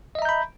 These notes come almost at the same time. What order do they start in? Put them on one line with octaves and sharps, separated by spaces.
D#5 E5 A#5 G6 B5